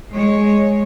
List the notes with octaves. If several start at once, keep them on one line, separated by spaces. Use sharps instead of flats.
G#3 C#5